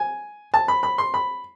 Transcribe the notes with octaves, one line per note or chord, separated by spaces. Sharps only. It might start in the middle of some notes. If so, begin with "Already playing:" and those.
Already playing: G#5
A5
B5
B5
C6
B5